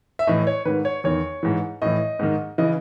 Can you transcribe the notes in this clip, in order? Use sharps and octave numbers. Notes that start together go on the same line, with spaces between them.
E5
A2 E3 D#5
C#5
G#2 D#3 B4
C#5
E2 D#3 C#5
G#2 E3
A2 E3 D#5
G#2 D#3
C#3 E3 D#5